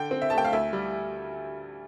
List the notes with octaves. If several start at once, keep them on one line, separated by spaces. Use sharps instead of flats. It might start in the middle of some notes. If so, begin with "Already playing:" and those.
Already playing: D3 G5
C4
E5
A5
A3 G5
F5
D2 E5
G3